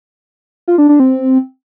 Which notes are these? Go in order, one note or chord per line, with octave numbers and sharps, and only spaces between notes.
F4
D4
D4
C4